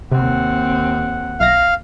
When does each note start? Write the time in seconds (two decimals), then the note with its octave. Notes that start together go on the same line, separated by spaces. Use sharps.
0.12 D#2 C3 C4 F#5
1.40 B1 E5 F5 A#6